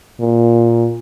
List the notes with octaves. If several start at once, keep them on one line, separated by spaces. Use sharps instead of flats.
A#2